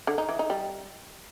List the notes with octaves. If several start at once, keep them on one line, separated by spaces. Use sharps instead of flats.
D3
D#4
E3
D#4
G3